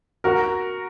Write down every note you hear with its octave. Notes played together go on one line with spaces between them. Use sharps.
F#4 A#4